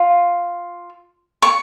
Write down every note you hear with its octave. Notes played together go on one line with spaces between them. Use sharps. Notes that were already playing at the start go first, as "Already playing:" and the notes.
Already playing: F4
C#6